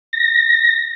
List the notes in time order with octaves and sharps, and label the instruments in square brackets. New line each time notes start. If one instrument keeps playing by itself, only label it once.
[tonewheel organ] A#6